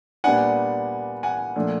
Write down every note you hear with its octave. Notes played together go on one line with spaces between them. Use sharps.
A#2 G3 B3 D4 F#5 G#5
F#5 G#5
A#2 F3 A3 D4